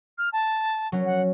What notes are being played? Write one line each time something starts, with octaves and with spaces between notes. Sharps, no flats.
F6
A5
F#3 C#4
F#5